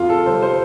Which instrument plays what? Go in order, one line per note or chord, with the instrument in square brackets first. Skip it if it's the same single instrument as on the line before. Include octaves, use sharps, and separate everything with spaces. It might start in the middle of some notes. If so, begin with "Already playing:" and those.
Already playing: [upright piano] F2 F4
A4
C3 G3 C5
C5